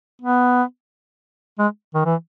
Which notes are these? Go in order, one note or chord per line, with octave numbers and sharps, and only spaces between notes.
B3
G#3
D#3
E3